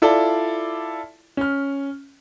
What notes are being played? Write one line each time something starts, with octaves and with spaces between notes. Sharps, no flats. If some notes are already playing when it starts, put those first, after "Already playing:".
E4 F4 A4 D5
C#4 F6